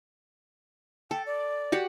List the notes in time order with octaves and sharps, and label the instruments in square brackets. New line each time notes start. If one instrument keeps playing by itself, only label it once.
[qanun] A4 [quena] G5
[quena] D5
[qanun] F#4 G4 F#5